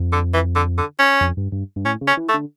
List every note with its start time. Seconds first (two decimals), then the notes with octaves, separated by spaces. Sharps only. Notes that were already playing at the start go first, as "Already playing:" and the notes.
Already playing: F2
0.12 D3
0.33 E3
0.56 D3
0.78 D3
0.99 C#4
1.21 F2
1.37 G2
1.52 G2
1.76 G2
1.85 A2 C#4
2.01 C#3
2.07 C#4
2.17 E3
2.29 A3
2.34 D3